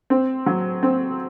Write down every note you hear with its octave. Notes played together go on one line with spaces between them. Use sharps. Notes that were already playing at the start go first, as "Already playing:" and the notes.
C4
F#3
C4